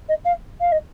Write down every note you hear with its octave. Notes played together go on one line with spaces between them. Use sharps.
D#5
F5
F5
D#5